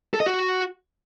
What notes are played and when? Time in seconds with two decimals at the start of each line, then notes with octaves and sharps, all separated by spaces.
0.14 A4
0.20 D#5
0.26 F#4